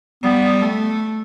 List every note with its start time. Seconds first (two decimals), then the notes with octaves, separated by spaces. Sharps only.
0.23 G3 B3
0.62 A3